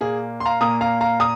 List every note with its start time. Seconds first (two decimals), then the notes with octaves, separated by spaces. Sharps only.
0.01 A#2 A#3 G#4
0.40 C6
0.45 F5 A#5
0.61 A#2 A#3 A#5 D#6
0.81 F5 A#5
1.01 F5 A#5
1.20 A#2 A#5 D#6